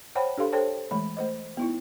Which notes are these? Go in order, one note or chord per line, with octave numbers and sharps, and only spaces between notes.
C5 C#5 F#5 G5 A5 B5
D4 G4 A4 F5 C6
A4 C5 C#5 G5 A5
E3 G#3 A3 B5
A3 C5 D#5
B3 D#4 E4